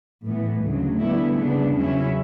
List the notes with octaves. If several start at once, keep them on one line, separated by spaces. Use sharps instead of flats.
A2 E3 B3
D2 C#3 F#3
D3 G3 B3 E4
C#3 G3 B3 D4
E2 C#3 F#3 C#4 E4